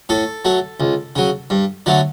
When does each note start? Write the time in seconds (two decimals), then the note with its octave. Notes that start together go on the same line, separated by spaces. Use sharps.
0.09 A2 A4
0.45 F#3 A3
0.80 C#2
1.16 C#3 F#3
1.50 G2
1.86 D3 F#3 A3